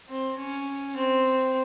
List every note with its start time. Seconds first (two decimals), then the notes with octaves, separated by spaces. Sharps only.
0.09 C4
0.38 C#4
0.96 C4